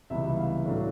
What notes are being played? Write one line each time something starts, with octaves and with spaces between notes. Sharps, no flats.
C#2 C3 E3 G3 B3 E5
F5
A2 F#3 A3 D4